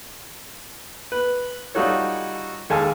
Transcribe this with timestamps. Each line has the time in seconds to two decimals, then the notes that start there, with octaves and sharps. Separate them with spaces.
1.12 B4
1.75 G3 D#4 F4 F#4 A4 C#5
2.70 D#2 G#3 A4 F5 G#5 A5